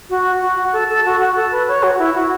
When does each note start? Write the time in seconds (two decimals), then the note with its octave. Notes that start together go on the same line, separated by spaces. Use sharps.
0.10 F#4
0.42 F#4
0.73 A4
0.89 A4
1.05 F#4
1.20 F#4
1.36 A4
1.52 B4
1.68 C#5
1.83 F#4
1.99 E4
2.15 F#4